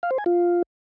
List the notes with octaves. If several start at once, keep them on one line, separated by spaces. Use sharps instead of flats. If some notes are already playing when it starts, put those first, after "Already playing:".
F5
C5
G#5
F4